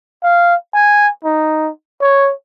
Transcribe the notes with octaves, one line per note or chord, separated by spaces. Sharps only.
F5
G#5
D#4
C#5